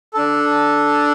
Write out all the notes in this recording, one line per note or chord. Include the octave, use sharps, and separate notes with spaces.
D4 A4